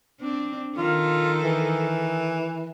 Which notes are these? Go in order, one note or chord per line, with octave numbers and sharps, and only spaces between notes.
C4 D4
D#3 F4 A4
E3